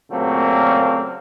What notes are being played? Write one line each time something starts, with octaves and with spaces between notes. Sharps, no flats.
A#2 C#3 F#3 A3 A#3 C4